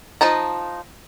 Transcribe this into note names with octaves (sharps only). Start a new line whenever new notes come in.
F3 D#4 A5 A#5